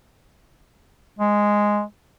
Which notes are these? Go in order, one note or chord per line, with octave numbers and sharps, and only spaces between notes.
G#3